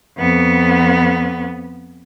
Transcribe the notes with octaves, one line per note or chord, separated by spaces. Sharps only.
F2 B3